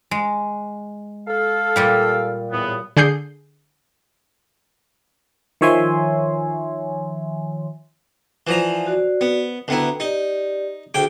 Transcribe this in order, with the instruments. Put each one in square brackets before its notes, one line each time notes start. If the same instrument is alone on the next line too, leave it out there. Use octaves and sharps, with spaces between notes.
[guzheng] G#3
[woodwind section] A4 F5
[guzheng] A#2 G3 G4
[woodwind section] E2 A2 B3
[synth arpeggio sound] D3 G#4 G6 C7
[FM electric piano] D#3 F3 C#5 E5 G#5 C6
[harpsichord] E3 F3 A#5 [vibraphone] D5 F#5 G#5
[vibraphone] F#4 C5 D5
[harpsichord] B3
[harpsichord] D2 B3 E4 [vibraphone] B4 G5 A#5
[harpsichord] D#4 [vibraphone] G4 D5
[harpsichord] D2 G5 D6 [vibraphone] G#4